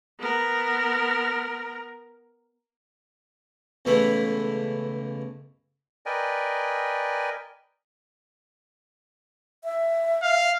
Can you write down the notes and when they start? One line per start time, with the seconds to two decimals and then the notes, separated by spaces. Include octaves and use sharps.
0.20 B3 A#4
3.85 C#2 B2 E3 A3 E4 B5
6.06 A#4 B4 D5 D#5 G5 G#5
9.64 E5
10.22 F5